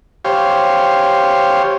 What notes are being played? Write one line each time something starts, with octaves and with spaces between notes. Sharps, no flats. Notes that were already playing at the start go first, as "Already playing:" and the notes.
G4 C5 C#5 F5